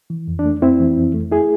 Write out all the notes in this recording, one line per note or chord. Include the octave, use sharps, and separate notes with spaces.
E3
F2
D4
A3
F2 C4 E4
E3
F2
A3
E4 G#4